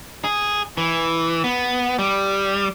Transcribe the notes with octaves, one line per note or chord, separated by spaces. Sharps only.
G#4
E3
B3
G3